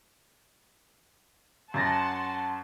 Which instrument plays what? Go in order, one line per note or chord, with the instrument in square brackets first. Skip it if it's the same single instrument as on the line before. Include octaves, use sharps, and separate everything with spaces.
[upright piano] F#2 A6 A#6 [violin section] F#5 A5 C6